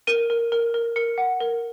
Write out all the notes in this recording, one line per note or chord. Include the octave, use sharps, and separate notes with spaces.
A#4 D#7
A#4
A#4
A#4
A#4 C#7
F#5
A#4